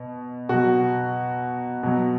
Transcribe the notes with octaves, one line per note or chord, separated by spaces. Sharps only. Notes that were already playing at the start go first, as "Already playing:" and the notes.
Already playing: B2
B2 F#3 F#4
B2 F#3